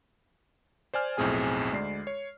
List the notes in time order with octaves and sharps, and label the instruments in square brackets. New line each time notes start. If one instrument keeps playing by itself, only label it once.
[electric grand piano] C5 D5 G#5 F6
B1 F2 A2 C4 G#4 G#5
D2 G#3 D5 C7
C#5